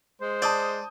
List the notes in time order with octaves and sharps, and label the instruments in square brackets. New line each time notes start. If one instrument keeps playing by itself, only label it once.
[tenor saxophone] G#3 [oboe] C5
[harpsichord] D5 [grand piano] A5 D#6 G6